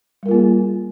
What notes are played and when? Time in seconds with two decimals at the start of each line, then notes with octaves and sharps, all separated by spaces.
0.23 G3
0.26 A#4
0.28 F4
0.31 A#3
0.34 G#4